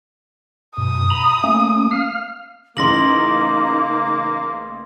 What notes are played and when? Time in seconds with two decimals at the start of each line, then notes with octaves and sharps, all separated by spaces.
0.77 F#2 B2 D#6
1.10 A#5 B5
1.44 A3 A#3 C#4
1.91 F5 F6
2.77 A1 C#3 A#3 D#4 C6 A#6 F#7